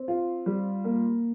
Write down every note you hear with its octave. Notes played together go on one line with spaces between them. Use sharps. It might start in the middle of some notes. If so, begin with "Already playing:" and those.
Already playing: C4
F4
G3
A#3